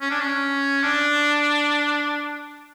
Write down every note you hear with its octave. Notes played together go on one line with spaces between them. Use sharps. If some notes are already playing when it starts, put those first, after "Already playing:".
C#4
D4
C#4
D4